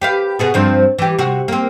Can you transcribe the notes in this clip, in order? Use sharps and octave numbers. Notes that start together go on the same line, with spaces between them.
G4 B4 F5
B2 B3 G#4
G2 F3 C4
E3 G4
C3 F#4
A#3 C4